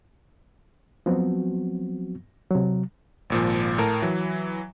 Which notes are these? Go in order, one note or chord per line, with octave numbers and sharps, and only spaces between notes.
F3 F#3 B3 C4 F#4
C3 F#3
G#1 A#2 F3
A2 A#4 A5
E3 F#3